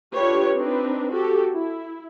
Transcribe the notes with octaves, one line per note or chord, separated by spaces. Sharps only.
D4 F4 G4 A4 B4 C#5
C4 D4 D#4 B4
F#4 G4 A4
E4